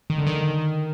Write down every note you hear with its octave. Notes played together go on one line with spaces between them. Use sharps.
D#3
D3
D#3